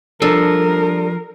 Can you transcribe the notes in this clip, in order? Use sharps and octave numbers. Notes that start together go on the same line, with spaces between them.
F3 G3 D4 A4 A#4